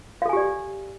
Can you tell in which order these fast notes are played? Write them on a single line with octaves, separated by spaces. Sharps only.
F5 A4 G#5 G4 D5